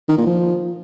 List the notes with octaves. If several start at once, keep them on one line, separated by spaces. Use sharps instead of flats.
D#3
A#2
F3